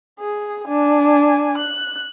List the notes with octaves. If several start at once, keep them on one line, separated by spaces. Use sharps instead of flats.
G#4
D4 G#5
F#6